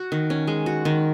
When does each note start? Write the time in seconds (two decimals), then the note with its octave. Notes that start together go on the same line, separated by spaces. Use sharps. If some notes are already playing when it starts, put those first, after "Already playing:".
Already playing: F#4
0.12 D#3
0.30 C#4
0.47 G#3
0.66 F#4
0.85 D#3